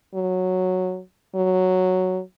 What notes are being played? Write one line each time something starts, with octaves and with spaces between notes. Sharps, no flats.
F#3
F#3